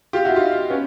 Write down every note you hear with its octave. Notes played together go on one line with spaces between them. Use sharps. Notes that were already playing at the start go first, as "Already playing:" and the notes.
F4 G4
E4 F#4
D#4 F4
B3 C#4